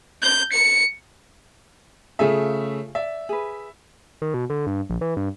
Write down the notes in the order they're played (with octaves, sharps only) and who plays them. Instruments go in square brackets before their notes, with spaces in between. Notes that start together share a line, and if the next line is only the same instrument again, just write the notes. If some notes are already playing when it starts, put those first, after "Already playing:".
[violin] G6
C#7
[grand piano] C#3 A3 E5 [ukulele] F4 G#4 A4
[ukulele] D5 [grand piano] E5
[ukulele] G#4 B4
[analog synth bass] D#3
B2
D3
G2
A#1
E3
G2